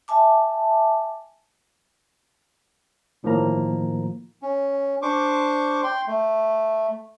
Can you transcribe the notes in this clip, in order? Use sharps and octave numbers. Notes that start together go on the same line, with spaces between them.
E5 G#5 A5 D6
G1 A2 D#3 F3 A#3 A#5
C#4
D4 C5 C#6 D6
G5 C6
A3